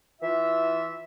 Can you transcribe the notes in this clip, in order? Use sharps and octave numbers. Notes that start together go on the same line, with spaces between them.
E3 F4 E5